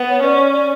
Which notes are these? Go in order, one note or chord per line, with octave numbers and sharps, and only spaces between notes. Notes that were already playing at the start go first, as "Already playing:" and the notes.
Already playing: B3
C#5
C#4 D5
C#5
D5